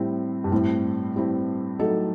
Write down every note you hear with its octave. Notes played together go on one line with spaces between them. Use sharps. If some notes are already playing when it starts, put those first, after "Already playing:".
Already playing: A2 G3 C4 E4
G2
A2 G3 C4 E4
G3 C4 E4
F#3 A3 D#4 A4